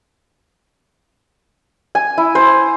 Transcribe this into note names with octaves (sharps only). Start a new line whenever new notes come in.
G#5
E4
C5